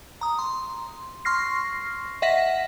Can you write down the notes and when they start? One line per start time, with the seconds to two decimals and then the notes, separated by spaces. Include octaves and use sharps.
0.21 A#5 D#6
0.39 C6
1.25 C6 C#6 F6 A#6 C7
2.22 D#5 E5 F#5 A#6 B6